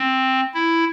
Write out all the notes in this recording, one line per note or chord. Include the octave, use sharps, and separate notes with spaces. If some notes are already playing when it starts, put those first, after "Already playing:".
Already playing: C4
E4